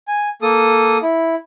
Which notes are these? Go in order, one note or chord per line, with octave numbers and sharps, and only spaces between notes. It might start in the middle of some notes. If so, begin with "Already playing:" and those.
G#5
A#3 A4 D#6
E4